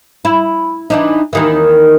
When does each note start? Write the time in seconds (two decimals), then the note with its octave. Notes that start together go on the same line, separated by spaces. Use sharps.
0.25 E4
0.90 E3 D4 D#4
1.33 D#2 D#3 E3